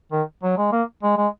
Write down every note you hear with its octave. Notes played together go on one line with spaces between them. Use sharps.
D#3
F#3
G#3
A#3
G#3
G#3